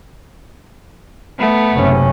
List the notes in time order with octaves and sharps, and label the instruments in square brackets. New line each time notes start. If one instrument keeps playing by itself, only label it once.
[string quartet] A3 B3
[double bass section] F#1 C3 C#4